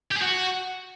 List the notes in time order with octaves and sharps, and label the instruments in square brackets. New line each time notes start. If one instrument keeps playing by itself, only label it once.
[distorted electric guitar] G4
G#4
F#4